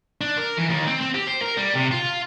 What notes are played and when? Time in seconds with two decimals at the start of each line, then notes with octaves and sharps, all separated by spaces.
0.21 D4
0.37 A#4
0.57 E3
0.69 D#2
0.87 C4
1.00 C4
1.14 G4
1.27 C5
1.42 A#4
1.57 G3
1.75 C3
1.91 F4